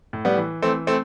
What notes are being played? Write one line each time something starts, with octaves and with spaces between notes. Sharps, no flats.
A2
G3 B3
E3
E3 A3 C4
A3 C4